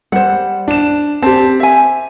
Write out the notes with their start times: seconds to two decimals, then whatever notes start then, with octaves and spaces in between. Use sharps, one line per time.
0.12 G3 C5 F#5
0.68 D4 E7
1.22 C4 G4 A5
1.60 E5 G#5